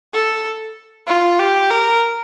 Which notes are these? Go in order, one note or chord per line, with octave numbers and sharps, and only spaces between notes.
A4
F4
G4
A#4